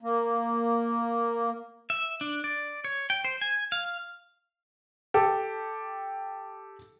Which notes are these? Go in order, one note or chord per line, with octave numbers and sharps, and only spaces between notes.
A#3
E5
D4
D5
C#5
G5
C5
G#5
F5
G4 A4